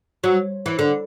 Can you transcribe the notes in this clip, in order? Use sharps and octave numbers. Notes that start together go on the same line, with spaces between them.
F#3
E3
D3